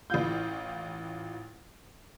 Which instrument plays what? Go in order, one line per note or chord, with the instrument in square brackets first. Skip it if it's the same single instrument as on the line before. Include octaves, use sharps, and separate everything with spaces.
[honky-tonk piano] A1 E3 F4 G6